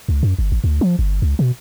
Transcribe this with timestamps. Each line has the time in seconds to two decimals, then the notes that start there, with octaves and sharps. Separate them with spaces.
0.09 C#2
0.23 F#2
0.39 G1
0.52 G#1
0.64 D2
0.81 F3
0.99 G1
1.22 C#2
1.39 B2